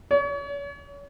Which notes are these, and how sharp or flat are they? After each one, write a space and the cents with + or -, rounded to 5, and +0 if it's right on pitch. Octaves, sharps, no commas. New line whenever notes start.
C#5 +35